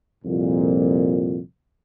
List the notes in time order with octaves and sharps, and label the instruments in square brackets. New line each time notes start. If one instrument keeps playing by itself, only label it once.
[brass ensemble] C2 F2 A#2